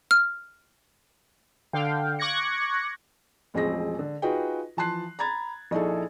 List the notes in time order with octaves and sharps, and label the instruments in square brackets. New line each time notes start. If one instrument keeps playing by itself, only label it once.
[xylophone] F6
[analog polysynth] D3 F5 G5
C#6 D6 F#6 G#6 A#6 C#7
[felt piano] E1 A1 F3 C4 G#4 A#6
D3
D#4 F4 F#4 G#4 B4 G5
E3 F3 A5 C6 F#6 C7
A#5 B5 G#6 A6
A#1 D#4 E4 G#4 A4